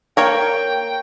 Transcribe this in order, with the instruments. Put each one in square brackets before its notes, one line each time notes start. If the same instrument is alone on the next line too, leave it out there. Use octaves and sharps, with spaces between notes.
[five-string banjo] A#3 C#5 A#5 [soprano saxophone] G5